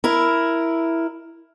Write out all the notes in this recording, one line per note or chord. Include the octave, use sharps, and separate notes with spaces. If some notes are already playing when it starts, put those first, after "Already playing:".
E4 A#4